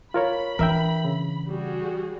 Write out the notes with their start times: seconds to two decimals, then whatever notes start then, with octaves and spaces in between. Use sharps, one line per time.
0.14 F4 A#4 C#5 B5
0.59 E3 D4 A#4 E5 G5
1.05 C#3
1.48 G3 F#4 G#4